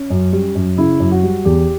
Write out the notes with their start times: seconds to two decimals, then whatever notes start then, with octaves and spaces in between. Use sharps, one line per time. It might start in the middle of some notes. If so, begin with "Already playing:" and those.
Already playing: C#4
0.10 F#2
0.33 G3
0.55 F#2
0.78 C#3 E4
1.00 F#2
1.11 F#4
1.23 G3
1.45 E2 G4